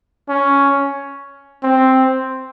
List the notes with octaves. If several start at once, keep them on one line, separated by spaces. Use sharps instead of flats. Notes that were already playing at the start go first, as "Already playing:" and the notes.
C#4
C4